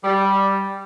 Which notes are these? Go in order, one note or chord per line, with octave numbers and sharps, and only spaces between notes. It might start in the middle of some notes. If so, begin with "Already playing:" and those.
G3